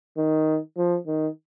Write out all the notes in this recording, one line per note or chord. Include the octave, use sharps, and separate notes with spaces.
D#3
F3
D#3